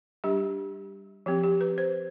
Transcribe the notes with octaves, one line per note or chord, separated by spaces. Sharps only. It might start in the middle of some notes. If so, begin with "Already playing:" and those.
G3 D4 G4
F3 C4 G4
G4
B4
C5